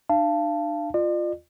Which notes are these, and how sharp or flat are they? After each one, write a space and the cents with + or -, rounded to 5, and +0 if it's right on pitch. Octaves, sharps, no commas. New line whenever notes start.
D4 +40 F5 -25 A5 +0
F4 +0 D5 +45